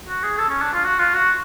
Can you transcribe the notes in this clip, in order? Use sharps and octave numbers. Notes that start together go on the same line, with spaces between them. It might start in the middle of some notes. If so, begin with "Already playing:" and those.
F#4
G#4
A4
C#4
D4
F4
F#4
F4
F#4